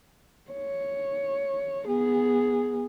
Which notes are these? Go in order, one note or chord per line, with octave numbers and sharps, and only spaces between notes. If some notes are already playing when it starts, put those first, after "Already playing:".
C#5
B3 G#4